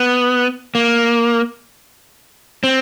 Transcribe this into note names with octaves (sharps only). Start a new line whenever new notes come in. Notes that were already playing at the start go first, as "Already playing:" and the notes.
Already playing: B3
A#3
C4